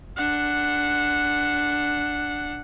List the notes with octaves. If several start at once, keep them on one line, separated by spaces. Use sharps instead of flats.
D4 F#5